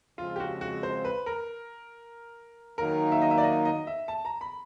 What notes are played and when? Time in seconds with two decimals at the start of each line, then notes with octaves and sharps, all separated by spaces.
0.18 C#3 F3 G#3 C4 F4
0.36 G4
0.40 F#4
0.61 F#4
0.83 C5
1.05 B4
1.26 A#4
2.78 D#3 F#3 A#3 D#4 A#4
3.12 E5
3.22 D#5
3.31 E5
3.38 D5
3.44 D#5
3.65 D#5
3.87 E5
4.08 A5
4.25 A#5
4.41 B5